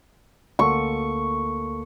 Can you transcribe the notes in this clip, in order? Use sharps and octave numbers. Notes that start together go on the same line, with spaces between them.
D2 A#3 A4 C#6